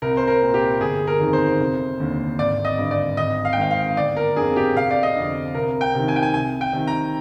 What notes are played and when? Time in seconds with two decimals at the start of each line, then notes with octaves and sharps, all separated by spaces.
0.02 C2 A#4
0.17 C5
0.27 A#4
0.41 A#2
0.54 G4
0.80 G1 G#4
1.07 A#4
1.20 F2 D#3
1.33 C5
1.60 F1
2.00 D#2 D3
2.39 G#1 D5
2.65 D#5
2.78 G2 D3
2.91 D5
3.17 G#1 D#5
3.45 F5
3.53 G5
3.57 G#2 D#3 F5
3.71 F5
3.97 G1 D5
4.16 A#4
4.36 F2 D3 G#4
4.56 G4
4.76 F1 F5
4.91 D5
5.03 D#5
5.16 F2 D3
5.55 C2 A#4
5.81 G5
5.95 C3 D#3
6.08 G#5
6.16 G5
6.23 G#5
6.34 C2 G#5
6.61 G5
6.73 C3 D#3
6.87 A#5